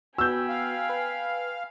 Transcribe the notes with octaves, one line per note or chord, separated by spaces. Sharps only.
B3 F#4 G5 G#5 B5 E6 G6
F5
B4